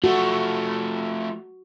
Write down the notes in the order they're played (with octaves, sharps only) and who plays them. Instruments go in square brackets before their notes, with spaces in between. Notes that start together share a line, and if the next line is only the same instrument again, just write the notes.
[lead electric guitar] F3 A3 [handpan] F#4